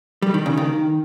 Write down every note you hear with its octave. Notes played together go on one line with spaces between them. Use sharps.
G3
D#3
C#3
D#3